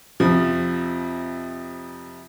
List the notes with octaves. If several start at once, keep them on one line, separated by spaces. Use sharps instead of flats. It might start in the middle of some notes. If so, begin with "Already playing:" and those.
F2 C3 F3